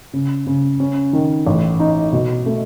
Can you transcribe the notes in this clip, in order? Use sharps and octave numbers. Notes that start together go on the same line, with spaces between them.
C#3
C#3
C#4
D#3
A1
D#4
B2
A3